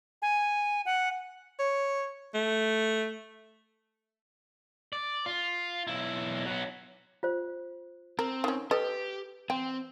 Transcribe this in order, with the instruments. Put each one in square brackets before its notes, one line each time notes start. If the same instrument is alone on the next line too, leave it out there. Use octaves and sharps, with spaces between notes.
[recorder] G#5
F#5
[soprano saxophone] C#5
A3
[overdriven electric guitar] D5
F4
B1 E4
F#3 B3
[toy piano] F4 C5
[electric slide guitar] C4 [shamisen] A#4
[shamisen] D#3 C#4
[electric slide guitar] G4 [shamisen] A4 D#5 [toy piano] B4
[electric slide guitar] C4 [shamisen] G5 [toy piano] C6